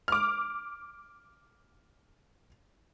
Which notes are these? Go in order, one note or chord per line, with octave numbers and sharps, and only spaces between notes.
D6 F6